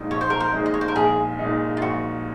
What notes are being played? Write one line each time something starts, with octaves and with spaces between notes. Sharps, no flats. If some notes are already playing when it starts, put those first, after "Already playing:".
Already playing: A#1 A#2 G#3 D#4
A#1 C#5
C5
A#4
C5
A#2 G#3 D#4
D#5
C#5
C5
A#4
A#1 G#4
A#2 G#3 D#4
F4
A#1 F#4